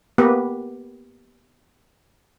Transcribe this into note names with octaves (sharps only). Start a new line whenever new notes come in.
A#3 B3 G4 B4